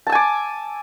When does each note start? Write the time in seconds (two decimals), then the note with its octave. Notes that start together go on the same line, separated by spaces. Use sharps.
0.07 A5
0.09 E6
0.12 G#5
0.15 D6